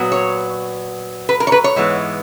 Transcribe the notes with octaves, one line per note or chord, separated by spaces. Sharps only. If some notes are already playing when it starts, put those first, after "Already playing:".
Already playing: A#2 F#3 B3
C#5
B4
A#4
C#5
B4
C#5
G#2 E3 G#3 B3